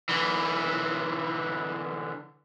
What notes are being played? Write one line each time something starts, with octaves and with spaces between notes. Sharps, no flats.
D3 E3